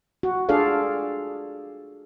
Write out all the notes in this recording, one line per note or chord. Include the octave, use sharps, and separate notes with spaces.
F#4
D4 F4 G#4 A4 D5 F5